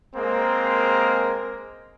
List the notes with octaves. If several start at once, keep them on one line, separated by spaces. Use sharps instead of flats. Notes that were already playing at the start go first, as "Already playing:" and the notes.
G#3 A#3 C4 G#4 A#4